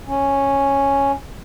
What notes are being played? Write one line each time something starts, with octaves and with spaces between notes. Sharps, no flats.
C#4